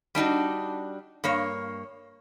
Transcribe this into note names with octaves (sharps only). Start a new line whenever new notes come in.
G3 D4 D#4 F#4
G2 A#3 C#5